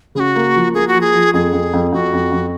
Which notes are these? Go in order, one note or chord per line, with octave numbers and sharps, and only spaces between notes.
C#3 F#4 G#4
A#3
F3
A#3 G#4
F#4
F3
G#4
F3
F2 G#4
F2
F2
F2 F#4
F2
F2